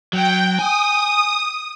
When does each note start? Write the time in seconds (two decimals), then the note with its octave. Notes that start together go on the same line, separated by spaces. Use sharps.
0.13 F#3 G5
0.59 G#5 D#6